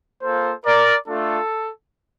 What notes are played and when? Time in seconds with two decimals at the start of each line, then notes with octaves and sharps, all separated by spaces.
0.22 A#3 F4 A4 C5
0.66 A#4 D5
1.08 A3 D4 F4 A4